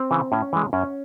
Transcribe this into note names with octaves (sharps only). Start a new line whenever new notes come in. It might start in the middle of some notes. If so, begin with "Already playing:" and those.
Already playing: C4
C#3 E3
A2 C#4
E3 G#3
F#2 C#4